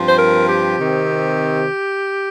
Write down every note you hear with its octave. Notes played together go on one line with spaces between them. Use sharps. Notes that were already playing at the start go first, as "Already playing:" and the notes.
Already playing: G2 F3 C4
C5
A#4
G4
C3 D#3 C4